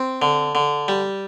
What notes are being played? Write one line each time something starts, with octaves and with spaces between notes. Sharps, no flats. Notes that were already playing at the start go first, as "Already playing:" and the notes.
Already playing: C4
D3
D3
G3